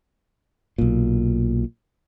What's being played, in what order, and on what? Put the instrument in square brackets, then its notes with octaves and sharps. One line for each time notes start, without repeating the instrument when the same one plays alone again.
[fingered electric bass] B1 A#2